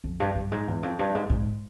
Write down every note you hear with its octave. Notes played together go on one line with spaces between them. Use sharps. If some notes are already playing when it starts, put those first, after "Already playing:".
F2
G2
G2
G#2
E2
F2
G2
G#2
G#2